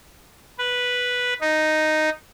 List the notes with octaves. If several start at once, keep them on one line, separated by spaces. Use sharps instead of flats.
B4
D#4